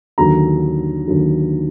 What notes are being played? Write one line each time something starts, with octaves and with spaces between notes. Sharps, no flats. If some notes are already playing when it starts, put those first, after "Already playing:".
D#2 D3 F#3 A#5
D#2 D3 F#3